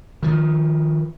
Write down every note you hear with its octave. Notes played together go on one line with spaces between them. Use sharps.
D#3 F3